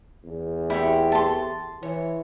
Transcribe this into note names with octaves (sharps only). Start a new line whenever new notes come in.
E2
A3 C4 E4 G4
A5 C6
E3 C#5